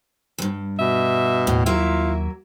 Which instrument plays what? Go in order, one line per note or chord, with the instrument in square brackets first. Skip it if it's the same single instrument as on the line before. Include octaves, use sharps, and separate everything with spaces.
[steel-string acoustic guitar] E2 G2
[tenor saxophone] B2 [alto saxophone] E5
[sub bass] D#2 [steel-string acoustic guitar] A2
[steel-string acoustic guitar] F#3 A#3 E5 [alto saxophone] E4 [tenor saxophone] F4